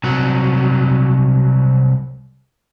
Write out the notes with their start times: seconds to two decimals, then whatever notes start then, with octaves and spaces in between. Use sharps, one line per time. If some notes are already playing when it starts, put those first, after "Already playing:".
0.04 C2 F#3